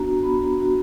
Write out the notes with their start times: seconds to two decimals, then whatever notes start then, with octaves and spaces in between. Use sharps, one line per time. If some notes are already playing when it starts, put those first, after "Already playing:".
Already playing: B3 D4 F#4 A#5
0.23 B3 B5
0.59 D4 F#4